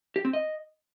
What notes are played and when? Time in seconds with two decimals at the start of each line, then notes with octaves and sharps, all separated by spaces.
0.16 G4
0.25 C4
0.33 D#5